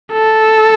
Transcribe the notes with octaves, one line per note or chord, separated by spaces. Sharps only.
A4